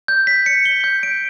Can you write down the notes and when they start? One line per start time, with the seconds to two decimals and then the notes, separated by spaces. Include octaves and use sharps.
0.08 G6
0.27 B6
0.46 C#7
0.65 G7
0.84 G6
1.03 D7